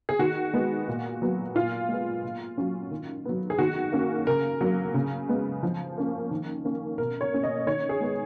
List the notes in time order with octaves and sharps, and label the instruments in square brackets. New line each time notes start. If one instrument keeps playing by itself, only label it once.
[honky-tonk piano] G#4
D#3 F#4
G#3 B3
A#2
F#3 B3
A#2 F4
G#3 B3
A#2
F#3 C#4
D#3
F#3 B3
G#4
D#3 F#4
A#3 C#4
C#3 A#4
F#3 A#3
C#3
G#3 B3
F3
A#3 C#4
D#3
A#3 C#4
B2 A#4
C#5
A#3 C#4
D#5
D#3 C#5
G#4
G#3 B3